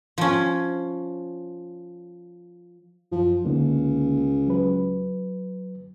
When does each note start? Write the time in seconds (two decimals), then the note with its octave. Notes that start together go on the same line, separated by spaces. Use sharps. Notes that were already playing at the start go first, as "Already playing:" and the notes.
0.18 F3 C#4
3.12 F#2 F3
3.45 C#2 D3 A#3 D#4
4.47 F#3 B4